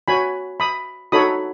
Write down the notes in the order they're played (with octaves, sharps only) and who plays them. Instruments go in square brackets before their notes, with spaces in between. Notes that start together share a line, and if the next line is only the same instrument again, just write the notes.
[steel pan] F#4 C#5 G#5 B5
B5 D#6
D#4 F#4 A4 C#5 B5 D#6